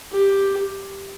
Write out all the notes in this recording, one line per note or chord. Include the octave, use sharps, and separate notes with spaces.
G4